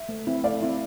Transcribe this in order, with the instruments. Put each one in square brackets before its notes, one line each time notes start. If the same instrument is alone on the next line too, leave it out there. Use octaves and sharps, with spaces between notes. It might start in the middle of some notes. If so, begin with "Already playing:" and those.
Already playing: [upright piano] E5
[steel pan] A3
C4 E4
[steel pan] A3 [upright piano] D5 F5
[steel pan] C4 E4